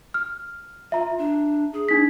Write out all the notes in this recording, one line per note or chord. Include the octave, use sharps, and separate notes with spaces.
F6
F4 E5 A#5
D4
G#4
D4 D#4 B6